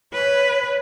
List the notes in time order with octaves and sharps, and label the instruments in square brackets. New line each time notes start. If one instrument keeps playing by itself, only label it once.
[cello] B4 [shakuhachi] C#5